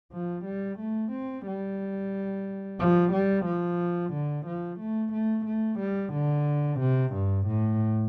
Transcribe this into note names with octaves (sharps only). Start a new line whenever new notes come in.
F3
G3
A3
C4
G3
F3
G3
F3
D3
F3
A3
A3
A3
G3
D3
C3
G2
A2